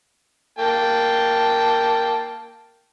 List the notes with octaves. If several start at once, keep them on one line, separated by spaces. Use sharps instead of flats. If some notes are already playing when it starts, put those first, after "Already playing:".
A#3 G5 A5